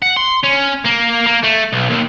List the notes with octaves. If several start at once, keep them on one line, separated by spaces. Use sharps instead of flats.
F#5
C6
C#4
A#3
A#3
A3
B1
D#2